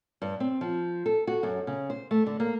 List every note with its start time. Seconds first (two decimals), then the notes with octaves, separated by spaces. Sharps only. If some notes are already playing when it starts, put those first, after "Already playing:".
0.22 G2
0.40 C4
0.61 F3
1.06 A4
1.27 F#4
1.43 F#2
1.67 C#3
1.90 C5
2.11 A3
2.27 D3
2.40 A#3